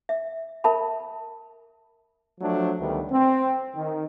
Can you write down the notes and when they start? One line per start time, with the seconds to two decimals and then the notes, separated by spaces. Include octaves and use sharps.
0.09 E5
0.64 A#4 E5 A5 B5
2.40 F3 F#3 A3 D4
2.79 D2 D#3 G3 B3
3.11 C4
3.75 D#3